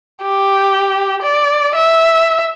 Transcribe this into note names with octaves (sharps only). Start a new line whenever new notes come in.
G4
D5
E5